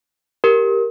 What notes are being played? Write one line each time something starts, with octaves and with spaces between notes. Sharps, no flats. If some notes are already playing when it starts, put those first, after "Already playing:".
G4 A#4